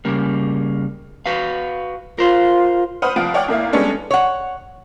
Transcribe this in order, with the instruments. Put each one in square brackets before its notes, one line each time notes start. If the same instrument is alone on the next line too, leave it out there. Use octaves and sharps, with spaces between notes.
[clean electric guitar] C#3 G3 A#3
F#4 B4 F5
[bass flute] F4 [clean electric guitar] A#4 C5
[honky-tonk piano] B4 C5 F#5 B5 D#6 F6
C2 F3 F5 F#5 D7
C#5 D5 F#5 G5 D6 F6
G#1 A#3 E4 F5
G3 G#3 B3 C#4 D4 A4
[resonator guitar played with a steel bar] C#5 F#5